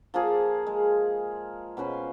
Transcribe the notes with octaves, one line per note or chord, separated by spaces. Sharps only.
F3 A#3 F4 G#4
G#3
B2 C#4 B4 C5